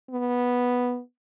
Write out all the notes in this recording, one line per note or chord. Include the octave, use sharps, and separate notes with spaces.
B3